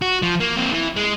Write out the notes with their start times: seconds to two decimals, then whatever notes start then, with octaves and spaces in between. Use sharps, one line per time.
0.02 F#4
0.22 F3
0.40 A#3
0.57 A#3 C4
0.72 E3
0.97 G#3